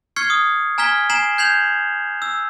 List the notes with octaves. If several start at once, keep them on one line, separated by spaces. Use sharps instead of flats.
C#6 F6 G#6 C7 C#7
D#6
G#5 A#5 F6 G#6 B6 G7
G#5 A#5 C7 E7 F#7
G6 G#6 C7 F7 F#7
E6